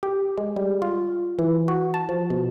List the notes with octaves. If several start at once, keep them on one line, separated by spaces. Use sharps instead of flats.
G4
G#3
G3
F4
E3
F#4
A5
F3
B2